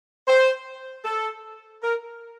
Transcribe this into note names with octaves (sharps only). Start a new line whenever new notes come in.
C5
A4
A#4